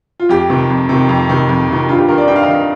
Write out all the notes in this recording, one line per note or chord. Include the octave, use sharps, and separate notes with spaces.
F4
F2 G4
C3 D#3
F2
C3 D#3
F2
C3 D#3
F2
C3 D#3
G2 F4
G4
D#3 A#4
D5
G2 G5
F5
D#5
D#3 F5